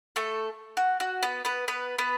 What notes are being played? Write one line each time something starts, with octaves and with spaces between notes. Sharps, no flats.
A3 A4
F#4
F#4
B3 B4
B3 B4
B3 B4
B3 B4